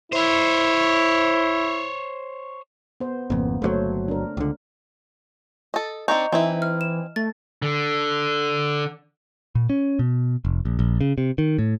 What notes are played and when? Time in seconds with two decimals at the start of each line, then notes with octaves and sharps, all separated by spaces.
0.12 E4 C5 C#5
3.00 B3 C5
3.30 G#1 F2 C#3 A#3 B3
3.62 G1 D3 F#3 A3 C5 C#5
4.08 D4 A#4
4.37 C#2 D3
5.74 A4 D#5
6.08 C4 D4 D#4 D#5 A#5 C#6 G6
6.32 E3 C4 D#4 E4
6.62 F6
6.81 E7
7.16 A3 A6
7.62 D3
9.55 A#2
9.70 C#4
9.99 B2
10.45 F1
10.65 A#1
10.79 A#1
11.01 C#3
11.18 C3
11.38 D#3
11.58 A2